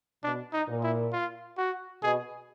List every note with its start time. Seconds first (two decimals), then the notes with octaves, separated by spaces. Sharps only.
0.24 B2 D4
0.53 D#4
0.68 A#2
0.83 E4
1.13 F4
1.58 F#4
2.03 B2 G#4